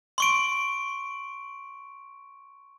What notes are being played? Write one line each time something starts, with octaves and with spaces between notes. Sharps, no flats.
C6 C#6 D7